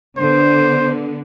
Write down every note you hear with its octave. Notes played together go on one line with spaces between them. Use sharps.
D3 B3 C5